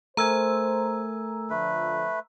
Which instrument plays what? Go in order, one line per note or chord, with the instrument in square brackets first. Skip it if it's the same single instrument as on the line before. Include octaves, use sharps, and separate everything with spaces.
[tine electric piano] A3 A#4 G#5 [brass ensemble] C5 [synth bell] A#5 E6
[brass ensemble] D3 F3 [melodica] A3 B4